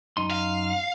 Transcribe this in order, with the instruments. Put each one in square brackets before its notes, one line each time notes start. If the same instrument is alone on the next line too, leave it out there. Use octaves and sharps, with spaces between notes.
[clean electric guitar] F#2 D#4 C6
[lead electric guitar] F5